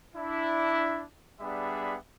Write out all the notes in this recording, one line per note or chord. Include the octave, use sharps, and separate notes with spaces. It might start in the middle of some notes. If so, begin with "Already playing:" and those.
D4 E4
G3 B3 D4 G#4 E5 B5